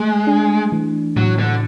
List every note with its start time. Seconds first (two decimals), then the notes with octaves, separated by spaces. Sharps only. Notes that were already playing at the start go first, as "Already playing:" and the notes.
Already playing: G#3 A3
0.27 D4
0.72 E3
1.16 A2 F#3
1.39 D3